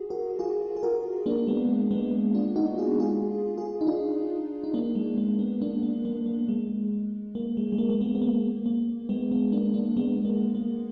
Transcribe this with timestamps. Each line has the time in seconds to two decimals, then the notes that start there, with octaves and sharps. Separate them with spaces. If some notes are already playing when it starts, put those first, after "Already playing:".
Already playing: F#4 G#4
0.10 F#4 A#4
0.39 F4 G#4
0.77 G#4
0.83 F#4 A#4
1.26 A#3 D4
1.47 G#3 B3
1.91 G#3 B3
2.34 D4 F4
2.56 D#4 F#4
2.78 F4 G#4
3.00 F4 G#4
3.57 F4 G#4
3.81 D#4
3.87 D4 F4
4.64 D#4
4.73 A#3 D4
4.95 G#3
5.18 A#3
5.39 G#3 B3
5.61 A#3 D4
5.83 A#3
6.05 A#3
6.26 A#3
6.48 G#3
7.35 A#3
7.57 G#3
7.72 G#3
7.78 A#3
7.90 A#3
8.01 G#3 B3
8.15 B3
8.22 A#3
8.66 A#3
9.09 G#3 B3
9.32 G#3 B3
9.52 A#3 D4
9.74 A#3 D4
9.97 G#3 B3
10.25 A#3
10.55 A#3